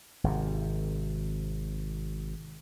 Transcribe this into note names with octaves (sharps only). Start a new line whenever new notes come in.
G#1 C3